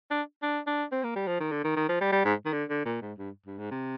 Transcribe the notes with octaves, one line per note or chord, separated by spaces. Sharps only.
D4
D4
D4
C4
A#3
G3
F3
D#3
D3
D#3
D#3
F3
G3
G3
G#2
D#3
D3
D3
A#2
G#2
G2
G2
G#2
C3